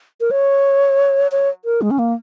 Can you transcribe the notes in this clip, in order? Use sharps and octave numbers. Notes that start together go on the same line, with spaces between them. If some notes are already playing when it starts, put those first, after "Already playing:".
A#4
C#5
C#5
A#4
G#3
C#4
A#3